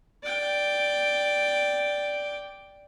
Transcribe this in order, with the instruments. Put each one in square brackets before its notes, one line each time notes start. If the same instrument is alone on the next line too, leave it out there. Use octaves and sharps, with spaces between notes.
[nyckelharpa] D5 G5